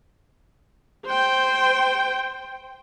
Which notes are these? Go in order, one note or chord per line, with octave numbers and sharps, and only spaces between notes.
C5 G5